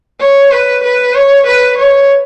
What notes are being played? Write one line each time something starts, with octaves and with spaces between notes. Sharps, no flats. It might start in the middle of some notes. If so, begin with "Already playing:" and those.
C#5
B4
B4
C#5
B4
C#5